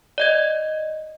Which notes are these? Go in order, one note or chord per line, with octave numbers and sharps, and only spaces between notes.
D5 D#5 G#6